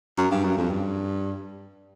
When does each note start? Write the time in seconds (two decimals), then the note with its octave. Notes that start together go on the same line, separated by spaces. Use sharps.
0.18 F#2
0.32 G2
0.44 F#2
0.58 F2
0.71 G2